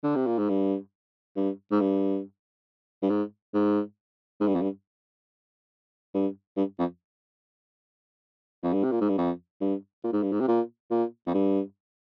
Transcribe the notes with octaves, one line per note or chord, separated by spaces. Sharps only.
D3
C3
A#2
G#2
G2
G2
G#2
G2
G2
G#2
G#2
G#2
G2
F2
G2
G2
G2
F2
F2
G2
C3
A#2
G#2
G2
F2
G2
A#2
G#2
G2
G#2
C3
A#2
A#2
F2
G2